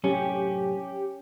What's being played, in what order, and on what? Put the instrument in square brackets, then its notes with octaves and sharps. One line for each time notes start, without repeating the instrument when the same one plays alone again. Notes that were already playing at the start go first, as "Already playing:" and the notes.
[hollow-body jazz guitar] F#2 A2 C3 [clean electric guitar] C#4 [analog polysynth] G4